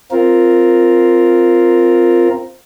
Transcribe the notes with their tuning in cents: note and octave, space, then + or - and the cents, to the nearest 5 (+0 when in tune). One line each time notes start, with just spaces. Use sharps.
C4 +0 F4 +0 A#4 +0